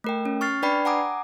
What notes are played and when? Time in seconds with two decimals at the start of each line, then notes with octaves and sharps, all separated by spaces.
0.04 A3 A#4 G5
0.25 C#4
0.41 C#6 F6 A6 C7
0.62 D4 B4 D5 G5 B5 C7
0.85 F#5 G#5 A#5 D6 D#6